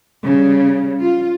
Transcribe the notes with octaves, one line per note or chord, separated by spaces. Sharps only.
C#3 G3
F4